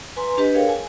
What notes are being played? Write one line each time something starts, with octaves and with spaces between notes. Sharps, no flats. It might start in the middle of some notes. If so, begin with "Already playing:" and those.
B4 G#5 A#5 C6
D4 G4 B4 D#5
G#4 A#4 C#5 F5 G5
G#5